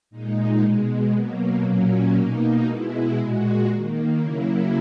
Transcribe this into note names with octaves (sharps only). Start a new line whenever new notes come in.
A#2 G#3 D#4
B2 G#3
B2 F#3 A#3
A#2 F#3 A#3 C#4
B2 A#3 D#4
B2 G#3 E4
A#2 G#3 F#4
D#3 A#3
C#3 F#3 A#3 E4